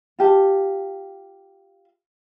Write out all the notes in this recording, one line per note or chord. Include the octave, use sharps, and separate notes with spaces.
F4 G4 A5